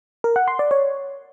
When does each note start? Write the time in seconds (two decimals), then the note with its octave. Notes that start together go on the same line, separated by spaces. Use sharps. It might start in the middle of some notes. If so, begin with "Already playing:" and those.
0.24 A#4
0.36 F#5
0.48 C6
0.59 D5
0.71 C#5